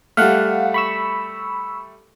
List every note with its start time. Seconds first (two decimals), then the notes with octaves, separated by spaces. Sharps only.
0.17 G3 A3 F5 F#5
0.74 B5 C#6 E6